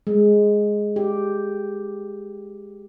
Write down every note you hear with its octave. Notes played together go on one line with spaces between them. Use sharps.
G#3
G4